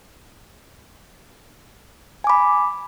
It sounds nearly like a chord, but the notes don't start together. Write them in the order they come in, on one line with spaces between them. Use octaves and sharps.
G#5 D6 B5